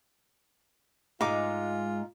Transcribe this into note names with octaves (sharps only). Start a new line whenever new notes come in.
G#2 G#3 D#4 F4 A#5 D6